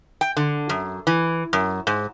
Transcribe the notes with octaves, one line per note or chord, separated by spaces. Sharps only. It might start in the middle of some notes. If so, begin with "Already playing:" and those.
G5
D3
F#2
E3
F#2
G#2